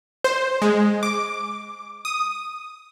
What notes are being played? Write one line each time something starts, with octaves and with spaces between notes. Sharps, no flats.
C5
G#3
D6
D#6